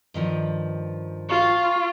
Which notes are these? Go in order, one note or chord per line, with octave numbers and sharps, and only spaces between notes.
G2 D#3 F3
F4 C#6